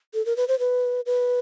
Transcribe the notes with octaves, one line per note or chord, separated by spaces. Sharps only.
A4
A#4
B4
C5
B4
B4